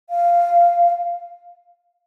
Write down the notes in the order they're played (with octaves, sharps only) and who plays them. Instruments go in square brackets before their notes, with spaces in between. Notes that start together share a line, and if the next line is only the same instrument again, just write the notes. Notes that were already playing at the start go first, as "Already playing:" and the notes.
[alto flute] F5